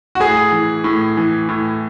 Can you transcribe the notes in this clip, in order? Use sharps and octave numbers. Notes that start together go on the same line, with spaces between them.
F#4
A2 G#4
E3
A2
E3
A2